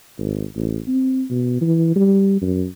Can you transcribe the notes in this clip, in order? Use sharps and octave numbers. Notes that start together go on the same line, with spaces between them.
G#1
A1
C4
B2
E3
G3
F#2